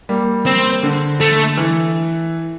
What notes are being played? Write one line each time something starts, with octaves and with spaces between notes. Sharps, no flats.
G3 A#3
C4
D3
A3
E3